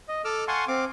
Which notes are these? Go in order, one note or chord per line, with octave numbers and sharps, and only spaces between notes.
D#5
A4 D6 E6 F6
F5 F#5 G#5 A5 C6 C#6
C4 F5 D6